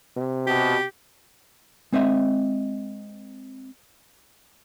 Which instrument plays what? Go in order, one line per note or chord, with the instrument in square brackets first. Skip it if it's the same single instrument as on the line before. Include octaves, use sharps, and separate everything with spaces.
[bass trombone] C3
[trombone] B2 [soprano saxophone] G4
[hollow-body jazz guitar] G#3 C4 D#5 E5